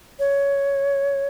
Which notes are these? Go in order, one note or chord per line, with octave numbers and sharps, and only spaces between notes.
C#5